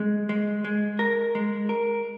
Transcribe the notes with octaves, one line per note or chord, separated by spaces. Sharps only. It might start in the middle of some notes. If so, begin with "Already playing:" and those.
Already playing: G#3
G#3
G#3
A#4
G#3
A#4